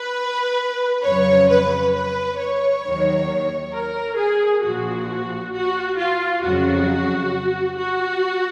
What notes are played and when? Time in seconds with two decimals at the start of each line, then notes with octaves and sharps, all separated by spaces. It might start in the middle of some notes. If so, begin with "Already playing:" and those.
Already playing: B4
1.05 F2 C#3 F#3 C#5
1.50 B4
1.95 B4
2.39 C#5
2.85 D#2 D#3 F#3
3.74 A#4
4.19 G#4
4.64 A#1 A#2 F3 F#4
5.54 F#4
6.00 F4
6.44 F2 C#3 F#3 F#4
7.79 F#4